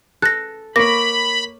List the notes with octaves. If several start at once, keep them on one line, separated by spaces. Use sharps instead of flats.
A4 F#6 A#6
A#3 C#5 B5 D6 A#6